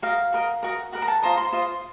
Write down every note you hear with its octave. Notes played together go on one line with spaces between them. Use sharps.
F#4 A#4 D#5 F5
F#4 A#4 D#5
F#4 A#4 D#5
F#4 A#4 D#5 F#5
A#5
A5
F4 C5 D#5 A#5
C6
F4 C5 D#5